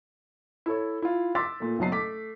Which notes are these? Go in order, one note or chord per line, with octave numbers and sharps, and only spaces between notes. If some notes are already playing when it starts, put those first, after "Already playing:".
E4 A4 C#5
E4 F4
C6 D6 E6 A6 B6
A#2 A3
F#1 B2 F#3 D#5 A5 C7
A3 D6 B6